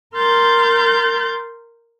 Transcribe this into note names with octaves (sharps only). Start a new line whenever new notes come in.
A#4 C6 F6 G6 A6